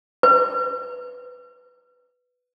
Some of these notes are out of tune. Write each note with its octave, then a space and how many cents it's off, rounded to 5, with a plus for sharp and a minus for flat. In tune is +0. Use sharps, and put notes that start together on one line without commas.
B4 +5